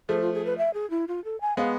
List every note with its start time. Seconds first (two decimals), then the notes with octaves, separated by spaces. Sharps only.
0.09 F3 A3 G#4
0.21 F4
0.34 G#4
0.45 B4
0.58 E5
0.74 G#4
0.90 E4
1.08 F4
1.24 A4
1.41 G#5
1.57 G#3 B3 F5